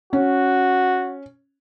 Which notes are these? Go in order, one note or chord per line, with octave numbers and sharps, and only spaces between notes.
C#4 F#4